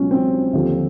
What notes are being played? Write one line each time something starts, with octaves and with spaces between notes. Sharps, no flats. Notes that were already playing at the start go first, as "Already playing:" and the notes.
Already playing: C#2 B2 F#3 C#4
C4
D#2 D3 F3